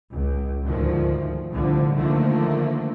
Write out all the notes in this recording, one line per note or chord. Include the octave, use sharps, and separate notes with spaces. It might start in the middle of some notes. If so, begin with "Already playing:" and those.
C#2
D2 G#2 D#3 F3
C2 A2 D3 F3
D3 D#3 F3 A3 A#3